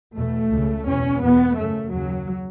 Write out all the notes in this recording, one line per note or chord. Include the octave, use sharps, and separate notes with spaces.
E2 B2 A3
C#2 C#3
E2 B2 C#4
E2 B2 B3
F#2 C#3 A3
D#2 C#3 F#3